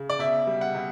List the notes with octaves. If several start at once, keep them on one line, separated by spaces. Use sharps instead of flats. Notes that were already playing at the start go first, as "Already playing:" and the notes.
Already playing: C#3
D5
B2 E5
G3
F#5
B2